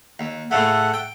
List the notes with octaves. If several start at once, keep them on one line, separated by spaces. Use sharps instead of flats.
D#2
A2 C#3 A3 A4 F#5
G5